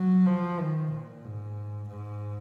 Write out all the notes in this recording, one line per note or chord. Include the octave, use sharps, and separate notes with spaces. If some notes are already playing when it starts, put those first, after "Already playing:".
Already playing: F#3
F3
D#3
A#2
G#2
G#2